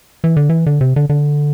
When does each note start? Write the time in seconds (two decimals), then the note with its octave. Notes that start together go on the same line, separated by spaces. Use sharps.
0.24 E3
0.37 D3
0.49 E3
0.66 D3
0.81 C3
0.96 D3
1.09 D3